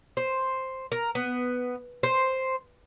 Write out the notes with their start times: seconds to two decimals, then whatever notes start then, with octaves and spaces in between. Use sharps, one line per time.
0.17 C5
0.92 A#4
1.15 B3
2.03 C5